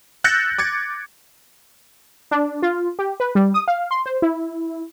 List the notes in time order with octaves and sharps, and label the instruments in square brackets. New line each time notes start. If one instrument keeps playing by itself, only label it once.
[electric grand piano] E6 F#6 G6 A6 A#6 C#7
D6 G#6 A6 C#7
[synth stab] D4
F4
G4
B4
G3
D#6
F5
C6
C5
E4